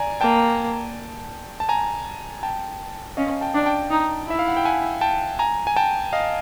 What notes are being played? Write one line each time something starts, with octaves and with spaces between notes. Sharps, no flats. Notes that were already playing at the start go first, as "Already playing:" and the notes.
Already playing: D5 G#5 A#5
A#3 G5 A5
A5
G#5 A#5
G5 A5
C#4 D#5 F5
G5 A5
D4
G5 A5
D#4
E4 E5
F5
F#5
G5
F#5 G#5
G5 A5
G#5 A#5
G#5
G5 A5
D#5 F5